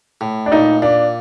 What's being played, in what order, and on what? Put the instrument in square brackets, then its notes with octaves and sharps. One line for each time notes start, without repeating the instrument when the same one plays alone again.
[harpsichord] A2
[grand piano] D4
[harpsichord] A#2 [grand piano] D#4
[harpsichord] A#2 [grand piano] D4